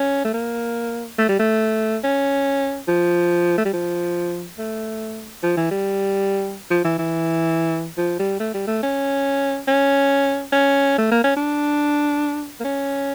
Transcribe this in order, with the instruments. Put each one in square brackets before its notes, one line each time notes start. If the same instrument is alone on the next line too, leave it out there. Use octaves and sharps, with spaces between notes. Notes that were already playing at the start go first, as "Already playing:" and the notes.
Already playing: [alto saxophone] C#4
A3
A#3
A3
G3
A3
C#4
F3
A3
G3
F3
A3
F3
E3
G3
F3
E3
E3
F3
G3
A3
G3
A3
C#4
C#4
C#4
A3
A#3
C#4
D4
A#3
C#4